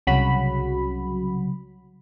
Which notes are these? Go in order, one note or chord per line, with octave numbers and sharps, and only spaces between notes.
C2 C#3 F#3 F#4 B5